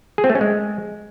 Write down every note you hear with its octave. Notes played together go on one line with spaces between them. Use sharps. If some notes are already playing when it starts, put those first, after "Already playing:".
G#4
C4
A3
C#4
G#3